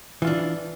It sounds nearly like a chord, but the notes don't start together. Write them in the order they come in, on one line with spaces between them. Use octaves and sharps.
E3 F4 D4